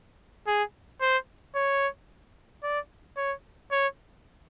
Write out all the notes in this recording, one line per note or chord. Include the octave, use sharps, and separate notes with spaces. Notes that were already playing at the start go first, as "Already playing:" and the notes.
G#4
C5
C#5
D5
C#5
C#5